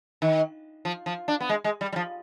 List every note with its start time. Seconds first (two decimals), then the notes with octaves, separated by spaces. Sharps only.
0.22 D#3
0.85 F3
1.06 F3
1.28 D4
1.40 B3
1.49 G#3
1.64 G#3
1.81 G3
1.92 G3
1.96 F3